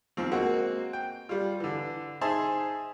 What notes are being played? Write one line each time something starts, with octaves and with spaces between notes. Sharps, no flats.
D#2 F3 C4
G#3 A#3 C4 F#4
G5
G3 F4
D3 E3
D#4 G#4 C5 E5 A5